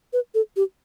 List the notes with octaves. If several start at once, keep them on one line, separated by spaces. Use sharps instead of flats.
B4
A4
G4